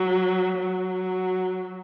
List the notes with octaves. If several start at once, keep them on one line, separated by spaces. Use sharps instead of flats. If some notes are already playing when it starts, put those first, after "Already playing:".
Already playing: F#3
F#3